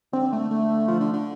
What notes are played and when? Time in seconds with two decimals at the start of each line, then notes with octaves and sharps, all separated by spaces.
0.13 D3 C4
0.33 A3
0.51 A3
0.88 F3
1.00 D3
1.13 D3